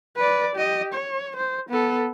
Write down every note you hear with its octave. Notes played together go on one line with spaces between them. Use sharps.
B4 D5
G4 D#5
C#5
C5
B3 A4